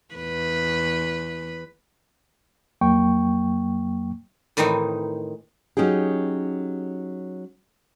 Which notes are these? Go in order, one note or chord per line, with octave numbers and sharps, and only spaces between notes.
E2 B4
F2 F#3 A#3 G5 C#6
A2 D#3 E3 C4 D#4
F#3 C#4 D#4 G4 G#4